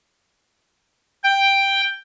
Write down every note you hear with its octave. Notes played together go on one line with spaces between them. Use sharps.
G5